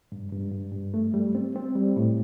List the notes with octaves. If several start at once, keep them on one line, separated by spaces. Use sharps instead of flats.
G2
G2
G2
G2
A3
G3
C4
C4
G3
A2